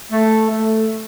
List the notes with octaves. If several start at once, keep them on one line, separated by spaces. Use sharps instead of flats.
A3
A3